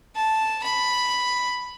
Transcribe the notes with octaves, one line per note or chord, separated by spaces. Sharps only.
A5
B5